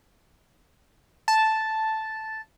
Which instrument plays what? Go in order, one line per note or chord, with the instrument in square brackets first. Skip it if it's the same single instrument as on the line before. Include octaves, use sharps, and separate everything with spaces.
[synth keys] A5